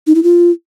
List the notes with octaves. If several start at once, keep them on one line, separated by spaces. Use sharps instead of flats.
D#4
E4
F4